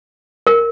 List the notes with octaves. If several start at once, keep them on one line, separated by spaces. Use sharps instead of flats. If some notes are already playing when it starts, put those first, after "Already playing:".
A#4